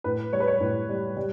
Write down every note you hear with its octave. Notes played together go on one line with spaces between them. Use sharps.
A2 B4
G3 C#5
B4
C#5
A2
G3
G3